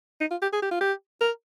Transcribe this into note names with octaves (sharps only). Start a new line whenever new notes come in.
D#4
F4
G4
G#4
G4
F4
G4
A#4